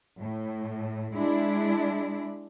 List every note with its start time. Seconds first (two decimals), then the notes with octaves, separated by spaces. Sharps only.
0.19 A2
1.14 G#3 D4 E4